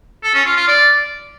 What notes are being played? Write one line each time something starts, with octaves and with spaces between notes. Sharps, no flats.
A4
C#4
F4
F4
D5